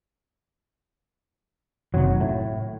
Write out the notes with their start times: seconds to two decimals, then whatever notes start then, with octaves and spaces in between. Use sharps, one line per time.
1.94 F#1 C3 D#3 F#3
2.20 A2